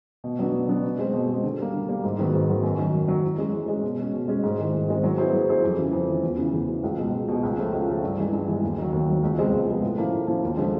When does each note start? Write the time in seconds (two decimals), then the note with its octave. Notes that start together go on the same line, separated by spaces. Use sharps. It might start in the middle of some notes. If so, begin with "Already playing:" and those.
0.24 B2
0.39 F#3 B3 D4
0.54 B2
0.69 F#3 B3 D4
0.83 B2
0.99 G#3 C4
1.13 B2
1.29 G#3 C4
1.43 D3
1.59 G3 A#3
1.74 D3
1.88 G3 A#3
2.04 G#2
2.19 D#3 F#3 B3
2.34 G#2
2.49 D#3 F#3 B3
2.63 F#2
2.78 D#3 F#3
2.94 F#2
3.08 D#3 F#3
3.24 E3
3.38 G#3 C#4
3.53 E3
3.68 G#3 C#4
3.83 B2
3.99 G#3 C#4
4.13 B2
4.28 G#3 C#4
4.44 G#2
4.58 D#3 G#3 C4 E4
4.73 G#2
4.88 D#3 G#3 C4 E4
5.03 F#3
5.18 B3 E4 G#4 C5
5.33 F#3
5.48 B3 E4 G#4 C5
5.64 F2
5.79 C#3 E3
5.93 F2
6.08 C#3 E3
6.23 E2
6.38 C#3 E3
6.53 E2
6.68 C#3 E3
6.84 C#2
6.98 B2 G#3
7.13 C#2
7.28 B2 G#3
7.43 C#2
7.58 C#3 F3 A3 C#4
7.74 C#2
7.88 C#3 F3 A3 C#4
8.03 G2
8.18 E3 G#3
8.33 G2
8.48 E3 G#3
8.63 D#2
8.78 D#3 F#3
8.93 D#2
9.07 D#3 F#3
9.23 C#2
9.38 C3 F3 G#3 B3
9.53 C#2
9.68 C3 F3 G#3 B3
9.83 A2
9.98 F3 A#3 C#4 E4
10.13 A2
10.27 F3 A#3 C#4 E4
10.43 D#2
10.57 D3 F3 G#3